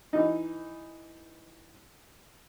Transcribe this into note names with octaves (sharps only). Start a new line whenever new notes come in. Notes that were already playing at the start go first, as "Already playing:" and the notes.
E3 D#4